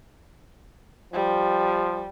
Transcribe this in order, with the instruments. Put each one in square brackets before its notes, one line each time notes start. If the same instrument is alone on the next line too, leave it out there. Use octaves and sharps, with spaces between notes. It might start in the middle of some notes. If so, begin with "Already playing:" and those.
[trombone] F3 [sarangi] G3